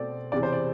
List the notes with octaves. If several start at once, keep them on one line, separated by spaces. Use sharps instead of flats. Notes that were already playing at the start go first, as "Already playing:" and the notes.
Already playing: B2 A3 C4 D5
E2 C3 E3 D5
C5
D5